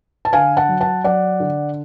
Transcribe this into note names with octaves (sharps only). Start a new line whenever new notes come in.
A5
D3 F5 G#5
F#5 A5
F#3
F#5 A5
F#3 D5 F#5
D3